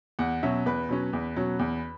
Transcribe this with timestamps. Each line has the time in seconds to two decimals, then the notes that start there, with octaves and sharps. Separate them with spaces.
0.19 E2 F#5
0.43 B2 F#3 C#4 E5
0.66 E2 B4
0.89 B2 F#3 C#4
1.13 E2
1.36 B2 F#3 C#4
1.59 E2